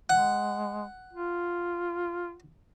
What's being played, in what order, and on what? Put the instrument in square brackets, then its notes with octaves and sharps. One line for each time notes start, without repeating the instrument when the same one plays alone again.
[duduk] G#3 [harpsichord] F#5
[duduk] F4